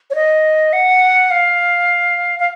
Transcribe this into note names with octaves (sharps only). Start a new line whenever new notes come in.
C#5
D#5
F#5
F5
F5